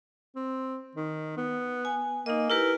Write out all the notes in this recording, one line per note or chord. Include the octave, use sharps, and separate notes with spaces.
C4
D#3
B3
G#5
A#3 D#4 D#5
E4 G4 A#4 B4